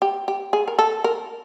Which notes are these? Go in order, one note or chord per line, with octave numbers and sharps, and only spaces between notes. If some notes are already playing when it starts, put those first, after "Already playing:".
G4
G4
G#4
A#4
A4
A#4